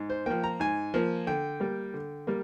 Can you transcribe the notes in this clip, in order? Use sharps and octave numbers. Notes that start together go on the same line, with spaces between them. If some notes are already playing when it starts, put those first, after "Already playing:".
Already playing: G#2
C5
F3 A#3 G5
A#5
G#2 G#5
F3 A#3
D3 G5
G3 A#3
D3
G3 A#3